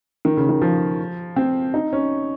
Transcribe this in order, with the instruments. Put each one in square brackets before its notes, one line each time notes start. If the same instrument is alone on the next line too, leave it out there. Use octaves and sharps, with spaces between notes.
[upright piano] D#3
C#3
D#3
F3
C4
D#4
C#4